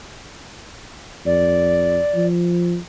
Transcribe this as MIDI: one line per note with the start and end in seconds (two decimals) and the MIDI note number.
1.26 2.00 41
1.26 2.26 74
2.15 2.77 53